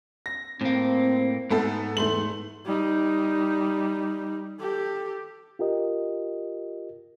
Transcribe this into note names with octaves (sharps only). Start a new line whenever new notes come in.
A#6
A2 A#3 C4
G#2 A3 B3 A4
E2 A3 C6 F#7
G3 D#4
G4 A4
F4 G4 A#4 D#5